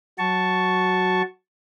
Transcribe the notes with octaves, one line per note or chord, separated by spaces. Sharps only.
F#3 F#4 A5 C#6